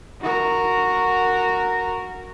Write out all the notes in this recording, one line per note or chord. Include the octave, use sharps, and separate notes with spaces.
F#4 A#4